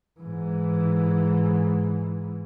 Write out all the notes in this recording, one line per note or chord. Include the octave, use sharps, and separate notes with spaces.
G#2 E3